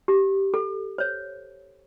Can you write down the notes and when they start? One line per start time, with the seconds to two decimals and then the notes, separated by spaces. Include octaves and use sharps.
0.08 G4
0.54 A4
0.98 C5 C#5